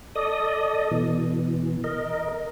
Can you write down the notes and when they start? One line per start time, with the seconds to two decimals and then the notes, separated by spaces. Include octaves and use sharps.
0.15 A4 D5 D#5 D#6
0.91 B2 E3
1.84 A#4 D#5